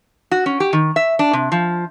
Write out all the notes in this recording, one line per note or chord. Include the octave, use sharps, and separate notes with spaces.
F#4
C#4
G4
D#3
E5
D4
C3
F3